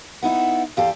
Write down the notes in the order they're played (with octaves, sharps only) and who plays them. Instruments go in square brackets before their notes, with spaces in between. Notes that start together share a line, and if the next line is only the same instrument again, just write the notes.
[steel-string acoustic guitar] B3 D#4 E4 [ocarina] F#5
[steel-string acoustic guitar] E2 G4 A4 [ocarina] F5